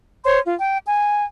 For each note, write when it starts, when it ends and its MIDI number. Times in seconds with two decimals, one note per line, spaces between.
0.24 0.39 72
0.24 0.39 73
0.24 0.39 84
0.46 0.54 65
0.59 0.79 79
0.87 1.24 80